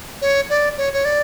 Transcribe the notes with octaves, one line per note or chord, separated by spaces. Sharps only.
C#5
D5
C#5
C#5
D5